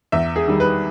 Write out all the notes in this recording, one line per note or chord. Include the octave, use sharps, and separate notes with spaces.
E2 E5
G#4
D#3 G3
B4